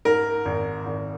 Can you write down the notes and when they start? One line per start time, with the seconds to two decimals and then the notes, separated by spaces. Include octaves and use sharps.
0.05 G#2 A#4
0.45 G#1
0.86 G#1